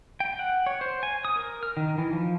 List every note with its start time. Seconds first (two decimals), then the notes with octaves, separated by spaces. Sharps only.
0.20 G5
0.39 F#5
0.66 C#5
0.81 C5
1.03 G#5
1.25 D#6
1.36 A#4
1.63 F6
1.77 D#3
1.98 E3
2.13 F3